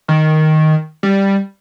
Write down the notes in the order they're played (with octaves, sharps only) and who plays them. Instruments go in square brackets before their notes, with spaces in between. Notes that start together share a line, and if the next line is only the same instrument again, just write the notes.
[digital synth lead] D#3
G3